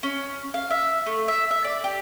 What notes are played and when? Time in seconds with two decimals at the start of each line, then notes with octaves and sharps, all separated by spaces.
0.03 C#4
0.54 F5
0.71 E5
1.06 A3
1.28 E5
1.51 E5
1.64 D5
1.84 G4